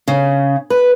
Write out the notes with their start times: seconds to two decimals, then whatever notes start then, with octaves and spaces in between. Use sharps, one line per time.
0.08 C#3
0.70 B4